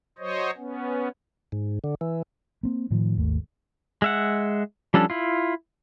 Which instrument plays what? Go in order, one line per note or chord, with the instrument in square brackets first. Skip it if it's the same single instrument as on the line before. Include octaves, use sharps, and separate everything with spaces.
[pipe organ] F#3 C5 C#5 D#5
B3 C#4
[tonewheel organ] G#2
D3
E3
[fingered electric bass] A#3 C4
A2 D#3 F3
G#1 D#2 A3
[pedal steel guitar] G#3 E5 F#5
F3 G3 C#4 D4 A4
E4 F4